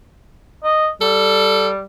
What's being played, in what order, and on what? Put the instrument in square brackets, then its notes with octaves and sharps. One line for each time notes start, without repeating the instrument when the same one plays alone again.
[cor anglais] D#5
[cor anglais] G3 [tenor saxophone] A4